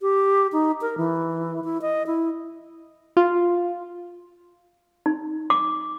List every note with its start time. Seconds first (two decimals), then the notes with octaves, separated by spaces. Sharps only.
0.01 G4
0.53 D#4
0.81 A#4
0.98 E3
1.64 E4
1.82 D#5
2.07 E4
3.17 F4
5.06 D#4
5.50 D6